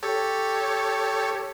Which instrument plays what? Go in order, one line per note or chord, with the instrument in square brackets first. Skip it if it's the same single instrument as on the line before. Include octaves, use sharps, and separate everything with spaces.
[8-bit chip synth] G4 A4 C#5